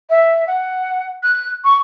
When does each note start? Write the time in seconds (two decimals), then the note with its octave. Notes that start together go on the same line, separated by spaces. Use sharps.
0.09 E5
0.47 F#5
1.22 F#6
1.64 C#6